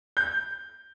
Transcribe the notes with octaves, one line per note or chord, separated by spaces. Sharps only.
G6